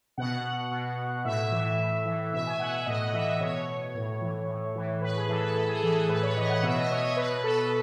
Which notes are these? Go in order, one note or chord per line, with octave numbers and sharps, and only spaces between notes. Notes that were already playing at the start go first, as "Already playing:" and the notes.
B2 F#5
B2
A2 E5
E3
A2
E3
B2 E5
G#5
F#5
E5
A2 D#5
F#5
E3 E5
E5
B2 C#5
A2
E3
A2
E3
A2 B4
G#4
E3 A4
B4
A2 A4
G#4
E3 A4
G#4
A2 B4
C#5
E3 D#5
F#5
B2 E5
D#5
C#5
C#5
B2 B4
A4